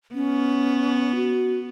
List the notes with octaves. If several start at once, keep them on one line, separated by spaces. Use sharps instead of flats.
B3 C#4
F#4